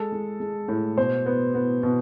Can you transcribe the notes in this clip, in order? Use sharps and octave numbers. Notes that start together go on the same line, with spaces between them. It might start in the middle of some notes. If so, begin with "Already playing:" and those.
Already playing: G#3 A4
G#3
G#3
A2
B2 C5
B3
B3
B2